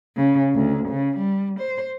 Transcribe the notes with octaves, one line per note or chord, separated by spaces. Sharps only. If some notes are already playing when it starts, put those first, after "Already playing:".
C#3
D2
C#3
G3
C5